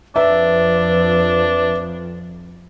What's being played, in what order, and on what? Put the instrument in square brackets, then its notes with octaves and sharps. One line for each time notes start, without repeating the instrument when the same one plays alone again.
[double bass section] F2 F3 [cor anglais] D4 [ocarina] B4 [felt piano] E5